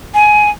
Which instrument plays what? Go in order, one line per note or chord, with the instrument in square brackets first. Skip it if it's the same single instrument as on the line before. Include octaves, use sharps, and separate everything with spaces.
[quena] G#5